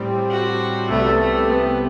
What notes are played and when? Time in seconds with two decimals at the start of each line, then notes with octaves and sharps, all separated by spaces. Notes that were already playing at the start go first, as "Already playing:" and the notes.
Already playing: A2 G3 C4
0.30 F#4
0.89 C2 C3 G3 A3 B3
1.20 A3
1.50 B3